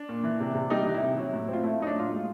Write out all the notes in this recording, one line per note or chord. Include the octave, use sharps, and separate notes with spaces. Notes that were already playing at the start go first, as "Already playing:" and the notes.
Already playing: D4
A#2
E3
C3
C3
G3 D#4
E3
E4
C3
F#3
A2
C4 F4
A3 E4
F#3 D#4
D4
A2 F4
G#3